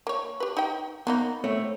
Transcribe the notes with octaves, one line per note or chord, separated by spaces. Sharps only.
A#3 C#5
G4 B4
D#4 G5
D#3 A#3 B3 D#4
A3 C4 C#5